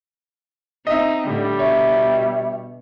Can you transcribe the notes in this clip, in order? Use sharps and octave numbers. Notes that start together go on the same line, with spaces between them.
C4 D#4 D#5 E5
A2 D3 G3
B2 C#5 E5